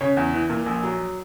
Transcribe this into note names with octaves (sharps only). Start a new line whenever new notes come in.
C#3 C#5
E2
E3
A#2
A#1
F#3